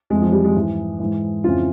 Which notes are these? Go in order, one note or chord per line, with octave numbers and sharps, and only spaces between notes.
F2 E3 G#3
F3
G3
G#3
G#2 E3
G#2 E3
F2 C#3 E3 F4